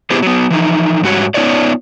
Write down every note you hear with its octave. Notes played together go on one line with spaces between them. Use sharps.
B3 E4 G4 G#4 B4 C5
F#3 B3
E3 F3 D#4
G#2 G3 F#4 G4 C#5
B3 D#4 F4 C#5 D5